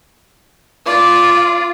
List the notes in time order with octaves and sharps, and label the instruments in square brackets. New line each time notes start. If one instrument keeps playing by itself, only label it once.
[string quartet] F4 [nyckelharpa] D5